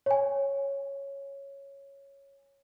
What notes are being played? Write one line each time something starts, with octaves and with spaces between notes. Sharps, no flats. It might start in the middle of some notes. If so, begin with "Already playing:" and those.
C#5 G#5